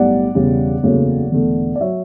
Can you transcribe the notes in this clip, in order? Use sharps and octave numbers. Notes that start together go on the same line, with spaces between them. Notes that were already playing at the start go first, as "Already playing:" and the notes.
Already playing: B1 A2 G3 D5 F#5
E1 E2 C#3 G3
F#1 E2 C#3 F#3 A3
E1 E2 D3 A3
D5
F#3 C#5 E5